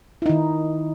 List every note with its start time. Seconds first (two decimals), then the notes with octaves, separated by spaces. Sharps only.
0.22 E4
0.26 D#4
0.29 D#3